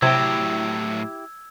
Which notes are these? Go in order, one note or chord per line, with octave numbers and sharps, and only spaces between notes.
A2 C3 F#3 E4 G4 E6 G#6